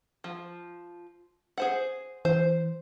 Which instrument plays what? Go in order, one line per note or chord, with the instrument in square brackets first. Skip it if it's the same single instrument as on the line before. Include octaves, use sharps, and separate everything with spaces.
[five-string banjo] F3
G#4 C5 F#5
[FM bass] E3 [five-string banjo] C5